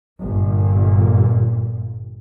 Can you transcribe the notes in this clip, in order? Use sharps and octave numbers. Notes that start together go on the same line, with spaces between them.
G1 A#2